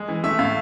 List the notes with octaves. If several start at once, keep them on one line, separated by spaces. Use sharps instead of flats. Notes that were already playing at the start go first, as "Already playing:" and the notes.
Already playing: G#3
E3
A3 E5
A2 F5